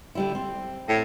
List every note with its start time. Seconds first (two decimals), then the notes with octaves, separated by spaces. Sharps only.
0.15 D3 G3 E4
0.35 C4
0.89 A2